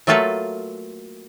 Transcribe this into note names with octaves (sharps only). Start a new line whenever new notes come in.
F#3 A3 A#3 F4 A4 B4